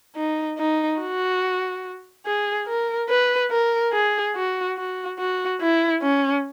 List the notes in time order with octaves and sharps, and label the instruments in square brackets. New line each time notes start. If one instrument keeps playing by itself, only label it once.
[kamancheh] D#4
D#4
F#4
G#4
A#4
B4
A#4
G#4
F#4
F#4
F#4
E4
C#4